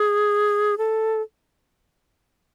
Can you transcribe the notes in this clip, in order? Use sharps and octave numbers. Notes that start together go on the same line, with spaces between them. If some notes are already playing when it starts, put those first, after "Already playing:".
Already playing: G#4
A4